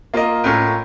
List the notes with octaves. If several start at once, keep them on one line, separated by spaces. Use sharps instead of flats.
A#3 F4 A#4 D#5
A2 A3 C#4 F4 A#4